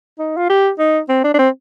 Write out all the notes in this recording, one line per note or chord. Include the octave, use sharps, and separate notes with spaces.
D#4
F4
G4
D#4
C4
D4
D4
C4